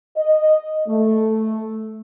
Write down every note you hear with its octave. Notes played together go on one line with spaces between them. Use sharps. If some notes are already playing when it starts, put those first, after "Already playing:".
D#5
A3